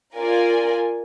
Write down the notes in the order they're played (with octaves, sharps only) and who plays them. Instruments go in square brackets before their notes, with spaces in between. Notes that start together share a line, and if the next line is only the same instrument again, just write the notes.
[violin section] F4 A#4 D5 G#5